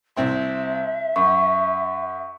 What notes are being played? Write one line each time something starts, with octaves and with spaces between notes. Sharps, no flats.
C2 C4 E5 C6
F#2 C#6